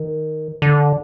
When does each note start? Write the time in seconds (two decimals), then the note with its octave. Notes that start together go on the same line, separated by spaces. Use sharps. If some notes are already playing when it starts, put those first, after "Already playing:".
Already playing: D#3
0.62 D3